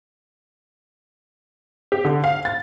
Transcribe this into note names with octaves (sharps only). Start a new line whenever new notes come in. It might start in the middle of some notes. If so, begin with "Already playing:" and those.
G4
D3
F5
A6